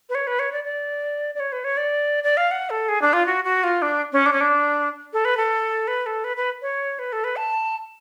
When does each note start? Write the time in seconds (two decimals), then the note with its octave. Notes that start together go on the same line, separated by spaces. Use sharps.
0.09 B4
0.15 C#5
0.27 B4
0.39 C#5
0.52 D5
0.64 D5
1.35 D5
1.40 C#5
1.52 B4
1.64 C#5
1.77 D5
2.24 D5
2.37 F5
2.51 F#5
2.70 A4
2.89 G#4
3.02 D4
3.13 F4
3.26 F#4
3.44 F#4
3.64 F4
3.82 D4
4.13 C#4
4.26 D4
4.33 C#4
4.41 D4
5.13 A4
5.25 B4
5.37 A4
5.88 B4
6.06 A4
6.24 B4
6.37 B4
6.62 C#5
6.99 B4
7.13 A4
7.24 B4
7.36 A5